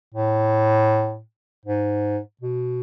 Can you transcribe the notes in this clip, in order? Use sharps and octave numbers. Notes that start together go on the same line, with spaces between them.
A2
G#2
B2